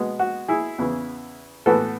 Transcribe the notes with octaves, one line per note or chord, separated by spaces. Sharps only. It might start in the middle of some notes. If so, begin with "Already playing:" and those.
Already playing: B2 G#3 B3
F#4
E4 G#4
E2 C#3 E3
A2 E3 B3 F#4 A4